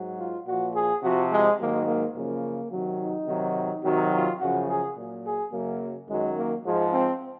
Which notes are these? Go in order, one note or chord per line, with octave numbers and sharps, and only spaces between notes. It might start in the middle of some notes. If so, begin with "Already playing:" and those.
Already playing: G#2 F#3
F4
A#2 F3 F#4
G#4
C3 F3 F#4
G#3
G#2 D#3 F#3 A#3
A#3
F#2 C#3 F3 A#3
C3 D#3 F#3
D#4
C3 D#3 F#3
C3 D#3 F#3
F4
F#2 C#3 F3 F#4
G#4
A#2 F#3
G#4
F#2 C#3 F#3 A#3
F#2 D#3 F#3 G#3
A#3
G#2 F3 G#3
C4